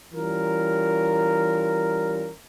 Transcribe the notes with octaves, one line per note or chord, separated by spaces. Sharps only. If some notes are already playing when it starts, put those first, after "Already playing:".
E3 G3 C#4 F4 A#4